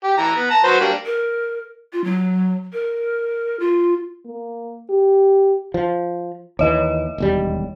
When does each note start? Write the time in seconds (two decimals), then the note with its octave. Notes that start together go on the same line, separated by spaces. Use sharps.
0.04 G4
0.18 E3 A#5
0.36 B3
0.50 A5 A#5
0.64 F#3 B4 C5
0.80 G3 A#3 D4
1.05 A#4
1.93 F4
2.04 F#3
2.73 A#4
3.60 F4
4.26 A#3
4.90 G4
5.74 F3
6.59 D#2 E3 C#5 D#5
7.18 E1 D#2 G3